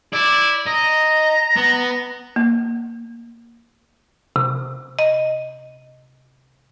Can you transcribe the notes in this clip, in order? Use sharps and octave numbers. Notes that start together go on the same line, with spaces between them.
E4 D5
D#5 A#5
B3
A#3
C3
D#5